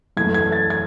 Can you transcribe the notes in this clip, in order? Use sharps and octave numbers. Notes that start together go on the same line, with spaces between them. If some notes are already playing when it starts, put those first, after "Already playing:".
F#2 E3 A3 G#6
G#6
A6
G#6